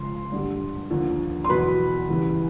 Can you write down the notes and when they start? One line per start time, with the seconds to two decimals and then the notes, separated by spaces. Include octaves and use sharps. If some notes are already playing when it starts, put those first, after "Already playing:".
Already playing: C#2 C#3 F3 C6
0.32 G2 D3 G3
0.90 D#2 D3 F3
1.44 C6
1.49 E2 B2 F#3 B4 B5
2.09 E2 C#3 E3 G3